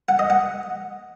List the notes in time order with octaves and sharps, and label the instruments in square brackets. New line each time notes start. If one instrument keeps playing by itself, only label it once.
[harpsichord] F#5
D#5
F#5